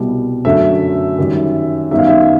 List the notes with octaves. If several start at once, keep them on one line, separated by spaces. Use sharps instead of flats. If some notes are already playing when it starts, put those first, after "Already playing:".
Already playing: C2 B2 G3
F#2 D3 F#3 A3 E5
F#2 D#3 G3
F#2 D#3 G3 B3 D#4 E5
F5
E5